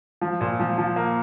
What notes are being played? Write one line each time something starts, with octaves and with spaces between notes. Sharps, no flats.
F3
A#2
F3
F3
A#3